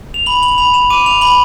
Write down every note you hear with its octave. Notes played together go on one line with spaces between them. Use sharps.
F7
B5 F#7
F#7
B5 F7
E7
D6 D#7
F7
B5 F#7